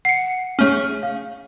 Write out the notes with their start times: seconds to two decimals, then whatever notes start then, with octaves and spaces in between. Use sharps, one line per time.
0.05 F#5 C7 C#7
0.59 A3 C#4 G#4 C#5 F6
1.03 F5